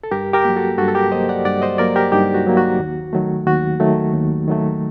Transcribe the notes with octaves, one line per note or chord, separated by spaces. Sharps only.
A4
G2 G4 A#4
G4 A#4
F#3 A#3
F#4 A4
G2 F#4 A4
A4
G4 A#4
F#3 A#3 C5 D#5
D5 F#5
G2 D5 F#5
C5 D#5
F#3 A#3 A#4 D5
G4 A#4
G2 D#4 G4
F#4
F#3 A#3
F#4
D#2
D#3 F#3 A3
D#2 F#4
D#3 F#3 A3
D#2
D#3 F#3 A3